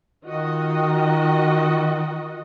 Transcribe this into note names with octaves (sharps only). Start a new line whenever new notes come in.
D#3 F4 F#4 D#5